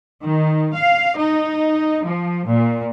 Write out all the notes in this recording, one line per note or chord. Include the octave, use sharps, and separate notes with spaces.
D#3
F5
D#4
F3
A#2